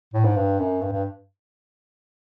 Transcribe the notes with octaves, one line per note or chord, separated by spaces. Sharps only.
A2
G#2
G2
F#2
G2
G2